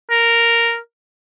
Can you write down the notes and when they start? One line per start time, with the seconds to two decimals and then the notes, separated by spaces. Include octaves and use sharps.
0.10 A#4